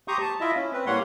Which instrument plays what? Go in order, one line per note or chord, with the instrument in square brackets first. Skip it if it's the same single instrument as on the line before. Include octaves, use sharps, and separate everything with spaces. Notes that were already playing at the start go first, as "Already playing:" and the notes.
[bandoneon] G4 A#5 C6 C#6 D#6 G6
A5
E4 F4 D#5 E5
C#4
C4 B4
A2 G3 A#3 C#5 F#5 C6